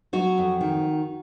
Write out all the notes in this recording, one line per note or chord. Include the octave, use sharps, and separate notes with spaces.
F#3 F#4
F2
D#3